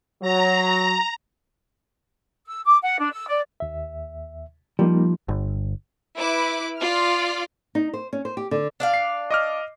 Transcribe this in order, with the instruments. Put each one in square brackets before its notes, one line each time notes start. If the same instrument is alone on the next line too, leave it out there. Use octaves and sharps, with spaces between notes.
[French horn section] F#3 [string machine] A#5
[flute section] E6
D6
F#5
D4
E6
D5
[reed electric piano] D#2 E5
[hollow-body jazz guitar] F3 [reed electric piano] G3 A#3 D#4
[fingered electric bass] G1
[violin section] E4 B4 D6
F4 D5 F6
[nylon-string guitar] D#4
C5
C#4
C5
G4
D3
[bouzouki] D4 D5 F5
[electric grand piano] C7
D#5 D6 F6